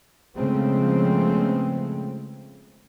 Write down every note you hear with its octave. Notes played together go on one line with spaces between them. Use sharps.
C#3 F3 G#3 A3 B3 C4